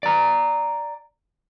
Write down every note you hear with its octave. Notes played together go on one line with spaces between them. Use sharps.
D5 A#5